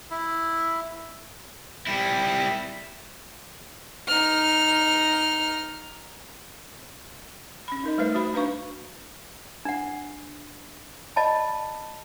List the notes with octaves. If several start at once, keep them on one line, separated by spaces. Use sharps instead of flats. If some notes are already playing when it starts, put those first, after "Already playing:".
E4
G3 E4
D#4 F6
C#4 B5
D#4 A#4 D#5
G3 A3 B4 C5 E5
F#4 C5 B5
D4 B4 F5 C#6
D4 F#5
D5 D#5 A5 B5